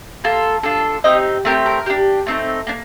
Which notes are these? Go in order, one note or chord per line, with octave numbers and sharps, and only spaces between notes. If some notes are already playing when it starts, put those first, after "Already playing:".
A#3 F4 A4
D4 F4 A4
C4 D#4 G4 D#5
A3 C4 G4 A#4
A#4
D4 G4
A3 C4 D#4
A#3 D4